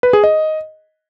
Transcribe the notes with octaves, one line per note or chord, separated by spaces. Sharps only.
B4
G#4
D#5